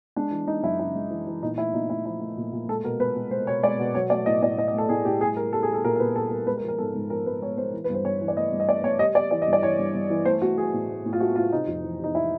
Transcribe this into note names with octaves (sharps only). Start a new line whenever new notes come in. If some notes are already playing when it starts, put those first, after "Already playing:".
G#3 D4
E3
G#3 D#4
F#2 E4
C#3 E4
G#3
E3
E3
A#2 D#4
A3 E4
A#2 D#4
A3 E4
F3 E4
A3
A#2
A#2
G#3 A4
B2 A#4
G#3 B4
G#3
G#3 C5
B2 C#5
G#3 D5
B2
F#3 C#5
A3 D5
A2 D#5
A2 D5
A2 D#5
D#5
A3 A4
A2 G#4
A2 G4
G3 G#4
G3 A#4
G3 A4
G#4
G3
A4
A#2 A#4
A#4
A#2 B4
G3 A4
G3 A#4
G#3 B4
A#4
F3
A#4
G#2 A4
G#2
F3 A#4
G#3 B4
G#3 C#5
G#3 C5
E3
B4
G2 C5
G2 C#5
E3
D5
A3 D#5
G2
D#5
A3 D5
A3 C#5
G3 D#5
G3 D5
E3 D5
D#5
G2
D5
E3 C#5
G2
G2
E3
A3 C5
A3 F#4
A3 G#4
A2
A3
A2
F4
A3 F#4
A2 F4
C3 D#4
F2
E3
C3 D#4
E3 E4